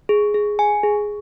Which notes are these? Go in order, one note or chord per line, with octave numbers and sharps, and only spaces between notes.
G#4
G#4
G#5
G#4